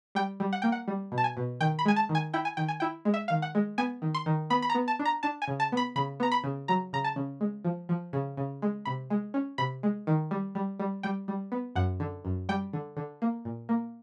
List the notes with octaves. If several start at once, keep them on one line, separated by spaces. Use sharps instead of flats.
G3 G5
G3
F#5
A#3 G5
F#5
G3
B2
A5
G#5
B2
D#3 G5
B5
G#3 G#5
A5
D#3
G#5
E4 G5
G#5
D#3 G5
G#5
E4 G5
G#3
E5
D#3 F5
F#5
G#3
B3 G#5
D#3
C6
D#3
B3 B5
B5
A#5
B3
A5
D4
A#5
D4 A5
G#5
C#3
A5
B3 B5
C#3 B5
B3 A#5
B5
C#3
F#3 A#5
C#3 A#5
A5
C#3
G#3
F3
F3
C#3
C#3
G#3
C3 B5
G#3
C#4
C3 B5
G#3
D#3
G3
G3
G3
G3 G5
G3
B3
F#2 F#5
D3
F#2
G3 G5
D3
D3
A#3
A#2
A#3